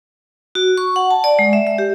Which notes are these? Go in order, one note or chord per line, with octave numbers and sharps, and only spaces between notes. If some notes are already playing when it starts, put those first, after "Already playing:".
F#4
C#6
F#5
A5
D5
G#3
E5
E5
G4